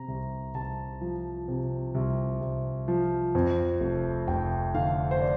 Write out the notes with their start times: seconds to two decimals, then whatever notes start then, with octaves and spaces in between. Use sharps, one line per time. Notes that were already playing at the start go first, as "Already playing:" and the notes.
Already playing: C3 A#5
0.08 C2
0.54 C2 A5
1.01 F3
1.48 C3
1.94 C2
2.41 C2
2.88 F3
3.35 F2
3.80 F1
4.28 F1 G5
4.74 D3 F5
5.11 C5
5.21 D5